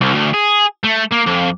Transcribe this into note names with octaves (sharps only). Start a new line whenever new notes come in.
C2
D2
G#4
A3
A#3
F2